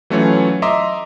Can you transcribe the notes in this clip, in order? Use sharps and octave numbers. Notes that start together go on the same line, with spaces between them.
E3 F#3 A3 C#4 F4 C#5
D#5 E5 A#5 C6 D6